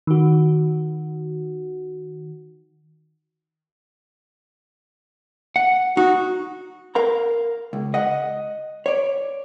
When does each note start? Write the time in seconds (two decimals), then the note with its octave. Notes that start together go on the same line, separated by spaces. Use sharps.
0.07 D#3 F#4
5.56 F#5
5.97 D#4 F#4
6.95 A#4 F5 A#5
7.73 C#2
7.94 D#5 F#5
8.86 C#5 D5